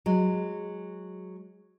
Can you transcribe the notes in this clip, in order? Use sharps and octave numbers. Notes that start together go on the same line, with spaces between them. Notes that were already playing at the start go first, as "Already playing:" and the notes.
F#3 G#3